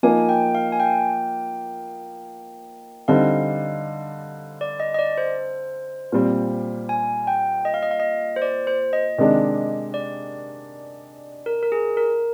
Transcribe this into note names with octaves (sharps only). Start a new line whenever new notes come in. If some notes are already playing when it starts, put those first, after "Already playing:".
F3 A#3 D#4 G#5
G5
F5
G#5
G5
D3 G3 C4 D#4 F5
D5
D#5
D#5
D5
C5
A#2 G3 C4
G#5
G5
D#5
F5
D#5
F5
D#5
C5
D5
C5
D#5
C3 D#3 G#3 D4
D5
A#4
A#4
G#4
A#4